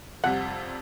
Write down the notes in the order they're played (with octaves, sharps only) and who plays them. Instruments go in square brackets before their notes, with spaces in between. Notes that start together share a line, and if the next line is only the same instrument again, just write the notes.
[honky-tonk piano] F2 C3 G3 [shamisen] F#5